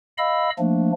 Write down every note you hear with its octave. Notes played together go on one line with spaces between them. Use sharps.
D#5 F5 B5 E6
F3 A3 A#3 D4